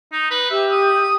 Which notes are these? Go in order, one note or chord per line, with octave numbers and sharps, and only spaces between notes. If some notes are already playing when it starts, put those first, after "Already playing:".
D#4
B4
G4 E5
D#6